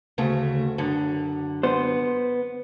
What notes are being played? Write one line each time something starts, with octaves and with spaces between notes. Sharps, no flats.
D2 C#3 A3
F#2 D3
B3 C5